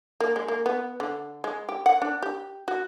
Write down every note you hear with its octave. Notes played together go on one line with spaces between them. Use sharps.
A#3
G#3
A#3
B3
D3
G#3
G4
F#5
D4
G4
F#4